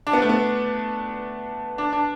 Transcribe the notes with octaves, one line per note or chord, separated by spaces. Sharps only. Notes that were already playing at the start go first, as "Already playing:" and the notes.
D4
B3
A3
B3
D4
D4